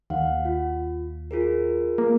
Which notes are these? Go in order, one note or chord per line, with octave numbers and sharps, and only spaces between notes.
D#2 F5 F#5
F4
F4 G#4 A#4
A#3